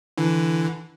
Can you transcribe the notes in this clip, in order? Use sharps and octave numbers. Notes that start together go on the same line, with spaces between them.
D3 E3